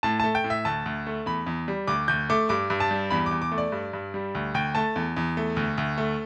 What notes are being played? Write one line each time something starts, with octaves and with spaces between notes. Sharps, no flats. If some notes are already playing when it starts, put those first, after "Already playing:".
A2 A5
A3 A5
G5
A2
E5
D2 A5
D2
A3
E2 B5
E2
G3
D2 D6
D2 G6
A3 D6
G2 D6
G2
A5
G3
E2 B5
E2 D6
D6
A3
D5
G2
G2
G3
D2
D2 G5
A3 A5
E2
E2
A3
D2
D2
A3